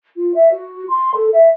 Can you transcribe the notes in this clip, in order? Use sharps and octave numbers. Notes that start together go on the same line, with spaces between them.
F4
E5
F#4
C6
A4
E5